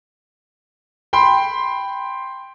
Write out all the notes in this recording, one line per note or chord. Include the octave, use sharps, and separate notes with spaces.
G5 B5 C6